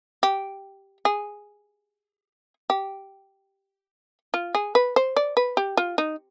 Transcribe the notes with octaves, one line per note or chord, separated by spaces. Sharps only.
G4
G#4
G4
F4
G#4
B4
C5
D5
B4
G4
F4
D#4